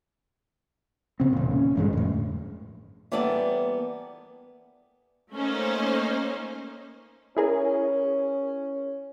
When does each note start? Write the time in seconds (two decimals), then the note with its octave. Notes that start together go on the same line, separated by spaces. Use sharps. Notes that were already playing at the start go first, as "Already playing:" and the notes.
1.20 C#3 C4
1.33 E1 A#2
1.51 C#4
1.76 A1 G2 D3 G#3
1.93 F2 A2
3.12 E3 G3 A#3 B3 A4 D5
5.32 A3 A#3 C#4 D#4 C5
7.37 C#4 E4 G#4 A#4